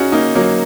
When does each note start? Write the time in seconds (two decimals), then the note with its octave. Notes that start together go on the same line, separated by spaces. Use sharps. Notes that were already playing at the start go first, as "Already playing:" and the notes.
Already playing: C#4 D#4 F#4 G#4
0.12 A#3 D#4
0.35 F#3 A#3